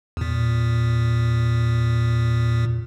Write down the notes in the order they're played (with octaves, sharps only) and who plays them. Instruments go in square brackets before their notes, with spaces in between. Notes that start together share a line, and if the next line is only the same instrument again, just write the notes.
[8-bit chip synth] E2 A#2